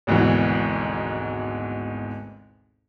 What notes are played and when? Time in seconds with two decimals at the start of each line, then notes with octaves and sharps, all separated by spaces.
0.07 G#1 D2 G#2 B2 E3